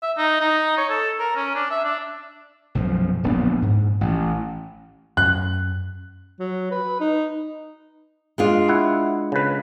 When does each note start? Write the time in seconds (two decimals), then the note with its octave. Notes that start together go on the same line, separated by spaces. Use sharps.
0.02 E5
0.18 D#4
0.41 D#4
0.78 C#5
0.90 A4
1.20 A#4
1.36 C#4
1.55 D4
1.71 E5
1.85 D4
2.75 B1 F#2 F3
3.23 D1 A#1 B3 D4
3.62 G#2
4.01 A1
5.17 F#2 C#4 F#6
6.40 F#3
6.71 B4
7.00 D#4
8.38 G#3 D4 F4
8.68 E4 F#5
9.32 C#3 B4